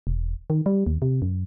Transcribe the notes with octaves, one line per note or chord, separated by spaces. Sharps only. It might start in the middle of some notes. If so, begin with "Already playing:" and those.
E1
D#3
G3
D#2
C3
F#2